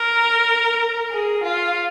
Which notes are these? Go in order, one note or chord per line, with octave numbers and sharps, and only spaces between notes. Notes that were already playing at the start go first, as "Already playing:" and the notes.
Already playing: A#4
G#4
F4